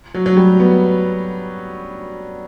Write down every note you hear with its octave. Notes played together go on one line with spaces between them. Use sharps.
F#3
F#3
G3
B3